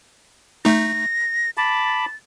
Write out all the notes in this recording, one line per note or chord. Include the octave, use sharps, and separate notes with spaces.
A3 D#4 A#6
A5 B5 D6 A6